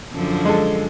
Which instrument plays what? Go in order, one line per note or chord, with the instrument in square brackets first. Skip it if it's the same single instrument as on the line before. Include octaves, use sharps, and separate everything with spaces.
[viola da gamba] F#2 D3 F3
[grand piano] G#3 A4